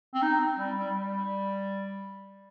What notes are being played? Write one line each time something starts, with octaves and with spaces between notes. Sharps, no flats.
C4
D#4
C4
G3
G3
G3